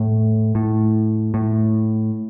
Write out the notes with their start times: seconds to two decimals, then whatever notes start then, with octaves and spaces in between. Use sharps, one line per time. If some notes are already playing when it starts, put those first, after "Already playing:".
Already playing: A2
0.55 A2
1.34 A2